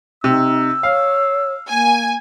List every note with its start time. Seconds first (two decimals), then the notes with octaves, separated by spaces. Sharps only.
0.24 C3 D#4 E6
0.83 C#5 F5
1.69 A#3 G#5